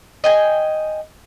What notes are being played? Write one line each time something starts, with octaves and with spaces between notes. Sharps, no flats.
D#5 G5 G#5